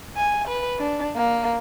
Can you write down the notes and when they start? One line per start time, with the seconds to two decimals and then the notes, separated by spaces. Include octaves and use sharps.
0.16 G#5
0.48 B4
0.79 D4
1.16 A#3